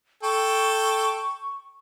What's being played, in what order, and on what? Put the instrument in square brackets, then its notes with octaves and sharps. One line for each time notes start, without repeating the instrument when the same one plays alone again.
[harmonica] A4 G5 [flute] C#6